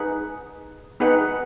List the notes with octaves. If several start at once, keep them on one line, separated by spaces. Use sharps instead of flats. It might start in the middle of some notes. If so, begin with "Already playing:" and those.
Already playing: D#4 G#4 B4 F#5
B3 D#4 G#4 B4 F#5